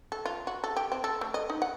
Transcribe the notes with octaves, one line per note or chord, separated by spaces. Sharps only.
A4
F4
F#4
A4
G4
C4
A4
A3
D#5
D#4
F#5